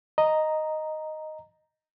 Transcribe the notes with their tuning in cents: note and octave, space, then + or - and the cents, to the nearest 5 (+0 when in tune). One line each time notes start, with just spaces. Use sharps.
D#5 +0 A#5 +0